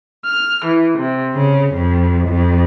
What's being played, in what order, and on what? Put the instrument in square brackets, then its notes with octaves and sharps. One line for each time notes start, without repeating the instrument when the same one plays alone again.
[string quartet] F6
E3
C3
C#3
F2
F2